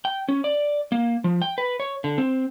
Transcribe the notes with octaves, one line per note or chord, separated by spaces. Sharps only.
G5
C#4
D5
A#3
F3
G5
B4
C#5
D3
C4